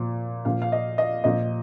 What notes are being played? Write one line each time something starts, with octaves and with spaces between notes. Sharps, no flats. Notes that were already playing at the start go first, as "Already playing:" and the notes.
Already playing: A#2 F3
A#2 F3 F5
F5
D#5
D#5
A#2 F3 D#5